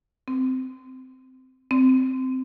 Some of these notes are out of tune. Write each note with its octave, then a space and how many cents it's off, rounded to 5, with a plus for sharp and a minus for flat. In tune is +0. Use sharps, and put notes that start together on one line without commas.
C4 -15
C4 -10